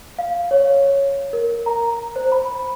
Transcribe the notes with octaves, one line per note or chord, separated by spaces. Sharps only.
F5
C#5
A#4
A#5
C5
B5